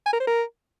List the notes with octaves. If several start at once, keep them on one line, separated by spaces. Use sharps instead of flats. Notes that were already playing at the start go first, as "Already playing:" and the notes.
G#5
A#4
C5
A#4